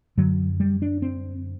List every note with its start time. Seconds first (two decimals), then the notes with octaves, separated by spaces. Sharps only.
0.17 F#2 D3 F#3
0.60 G3
0.82 D4
1.02 C4